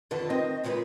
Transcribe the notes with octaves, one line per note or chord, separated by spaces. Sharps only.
F2 D3 D#3 B4 F#5 A5
D#3 C4 D#5
D2 A#2 C#3 F#3 G#3 B4